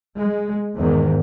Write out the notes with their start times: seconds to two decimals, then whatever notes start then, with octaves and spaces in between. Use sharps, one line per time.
0.18 G#3
0.76 E2 G#2 D#3